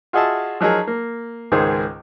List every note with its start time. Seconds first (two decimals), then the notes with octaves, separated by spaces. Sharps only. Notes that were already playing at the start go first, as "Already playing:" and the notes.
0.13 F4 F#4 G#4 D#5 E5 A5
0.61 F3 F#3 D#4 G#4 A#4
0.87 A#3
1.52 C#2 G#2 D#3 G#4 C5